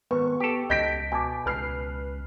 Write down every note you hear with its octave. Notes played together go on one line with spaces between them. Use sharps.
G#1 B3 B4 C#6
G4 A4
C#2 D#5 G6 A#6 B6 D7
B2 G#5 A5 D6
C#2 B4 F6 C7